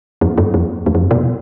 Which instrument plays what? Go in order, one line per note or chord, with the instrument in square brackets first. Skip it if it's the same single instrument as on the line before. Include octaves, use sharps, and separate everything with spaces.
[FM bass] F2
F#2
F2
E2
F2
F#2
B2